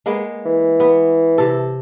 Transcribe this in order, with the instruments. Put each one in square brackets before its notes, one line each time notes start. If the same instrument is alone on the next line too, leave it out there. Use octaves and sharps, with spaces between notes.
[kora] G#3 A#3 B3
[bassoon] E3
[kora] B3
C3 A4